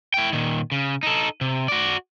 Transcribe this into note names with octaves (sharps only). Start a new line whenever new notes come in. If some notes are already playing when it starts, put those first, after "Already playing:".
E4 G5
A#2 D#3
C#3
D#4 A4
C3
F#4 D5